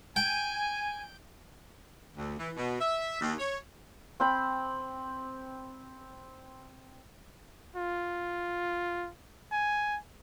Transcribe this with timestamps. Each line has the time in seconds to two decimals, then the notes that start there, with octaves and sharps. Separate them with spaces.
0.16 G5 G#5
2.16 D2
2.38 E3
2.57 B2
2.80 E5
3.21 D#2
3.39 C#5
4.20 C4 G5 B5
7.76 F4
9.52 G#5